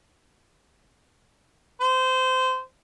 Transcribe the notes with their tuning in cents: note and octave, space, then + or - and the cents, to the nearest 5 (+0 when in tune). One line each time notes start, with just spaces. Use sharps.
C5 -20